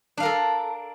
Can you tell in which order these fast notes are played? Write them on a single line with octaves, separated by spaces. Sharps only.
D4 F5 A#4 A4